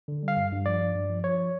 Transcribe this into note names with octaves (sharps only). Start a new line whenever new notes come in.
D3
G3
F5
G2
G2
F3 D5
G2
G2
F3
F3 C#5